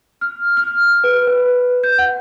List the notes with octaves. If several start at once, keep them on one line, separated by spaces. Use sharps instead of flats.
F6
F6
B4
B4
G6
F#5